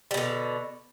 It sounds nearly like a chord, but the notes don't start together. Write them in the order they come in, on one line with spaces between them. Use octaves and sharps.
G3 B2 D3